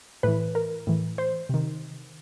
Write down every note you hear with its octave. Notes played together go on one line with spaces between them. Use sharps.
A2 E3 B4
A#4
A2 E3
C5
C3 D#3